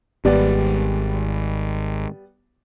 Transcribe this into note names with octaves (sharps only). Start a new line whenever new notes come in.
G#1 G3 B3 D5